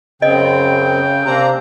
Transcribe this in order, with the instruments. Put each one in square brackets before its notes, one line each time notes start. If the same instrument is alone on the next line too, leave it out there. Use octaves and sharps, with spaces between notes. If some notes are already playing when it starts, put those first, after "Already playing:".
[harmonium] F#2 C4 [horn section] C#3 [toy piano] D#5 [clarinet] G5
[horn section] C3 C4 [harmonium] A#3 D4 A#5